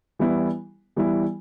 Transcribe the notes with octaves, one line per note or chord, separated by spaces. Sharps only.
E3 G3 B3 E4
E3 G3 B3 E4